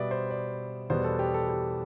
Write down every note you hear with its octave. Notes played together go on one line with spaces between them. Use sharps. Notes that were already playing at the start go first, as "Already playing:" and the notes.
Already playing: B2 G3 B3 D5 E5
C5
D5
E2 B2 G3 B3 C5
A4
G4
A4
G4